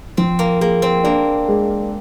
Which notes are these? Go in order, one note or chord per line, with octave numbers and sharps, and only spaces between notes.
F3 C4
A#3
A#3 G#4
C4
A#3 D4
G#3